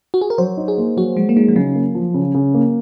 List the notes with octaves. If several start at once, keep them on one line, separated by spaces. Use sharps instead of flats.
F#4
G#4
A#4
F#3 C5
D#4
G#4
A#3
F#3 F#4
F#3 G#3
A#3
G#3 D#4
F3
C#3 F#3
A#3
F3
C#3
C#3
A#3